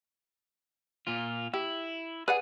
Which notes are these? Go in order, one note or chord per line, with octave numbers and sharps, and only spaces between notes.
A#2 F4
E4 G4
G#4 B4 D5 F#5